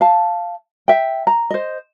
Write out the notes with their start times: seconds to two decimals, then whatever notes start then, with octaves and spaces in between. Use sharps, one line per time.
0.01 F5 A5
0.88 E5 G5
1.27 A#5
1.50 C5 D#5